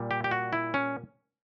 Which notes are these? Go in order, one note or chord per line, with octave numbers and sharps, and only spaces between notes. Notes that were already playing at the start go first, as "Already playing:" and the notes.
Already playing: A#2 G3
G4
G4
F#4
E4
C#4